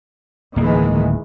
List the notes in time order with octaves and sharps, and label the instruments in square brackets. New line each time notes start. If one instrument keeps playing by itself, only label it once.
[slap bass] D1 A#3 [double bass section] D#3 E3 G#3